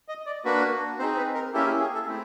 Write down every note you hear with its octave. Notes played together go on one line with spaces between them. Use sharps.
D#5
D5
A#3 D4 F#4 B4
C4 D#4 G#4 C5
B4
A#4
A#3 C#4 E4 G4 A4
G#4
G#4
A4
A3 C4 E4